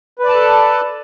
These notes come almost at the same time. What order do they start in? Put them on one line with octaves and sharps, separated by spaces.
B4 D5 A5 A4